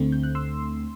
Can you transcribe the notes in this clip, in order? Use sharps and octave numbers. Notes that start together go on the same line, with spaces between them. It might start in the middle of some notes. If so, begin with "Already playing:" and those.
Already playing: D2 D3 A3 C4
G6
F#6
C6 E6